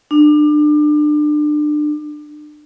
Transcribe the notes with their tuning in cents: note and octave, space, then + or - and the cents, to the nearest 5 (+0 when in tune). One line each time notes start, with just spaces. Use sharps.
D4 +30